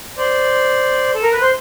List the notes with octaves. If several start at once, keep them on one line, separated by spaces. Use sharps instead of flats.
C5 D5
A4
A#4
B4
C5